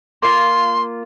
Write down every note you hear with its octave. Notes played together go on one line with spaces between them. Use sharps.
A#3 F4 C6